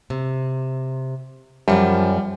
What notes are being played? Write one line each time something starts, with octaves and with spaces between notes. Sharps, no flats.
C3
F#2 C#3 F3 G3